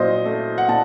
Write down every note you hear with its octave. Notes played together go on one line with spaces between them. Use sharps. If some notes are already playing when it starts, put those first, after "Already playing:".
Already playing: A#2 F#3 C5 D#5
A3
F#5
A#2 A5